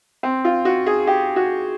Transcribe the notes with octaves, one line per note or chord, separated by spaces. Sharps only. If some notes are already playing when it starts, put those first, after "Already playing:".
C4
F4
F#4
G#4
G4
F#4